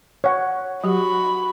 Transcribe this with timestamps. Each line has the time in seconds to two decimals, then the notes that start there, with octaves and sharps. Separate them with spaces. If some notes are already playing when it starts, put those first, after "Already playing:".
0.24 C#5 F#5
0.84 F#3 F#4 G4 B5